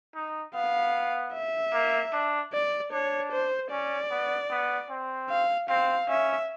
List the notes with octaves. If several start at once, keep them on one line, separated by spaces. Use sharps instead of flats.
D#4
B3 F5
E5
A#3
D4
D5
D4 C#5
C5
C#4 D5
B3
B3
C4
F5
C4 F5
C#4 E5